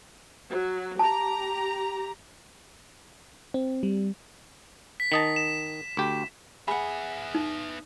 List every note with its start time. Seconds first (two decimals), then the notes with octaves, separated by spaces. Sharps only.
0.50 F#3
0.99 G4 A5 A#5
3.54 C4
3.83 G3
5.00 B6
5.12 D#3 D#5 A5
5.36 E7
5.97 D2 G4
6.68 B3 G#4 E5 F#5 B5
7.35 D#4